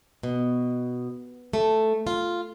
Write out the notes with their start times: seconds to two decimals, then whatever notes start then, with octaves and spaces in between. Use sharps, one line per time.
0.23 B2
1.53 A3
2.07 F4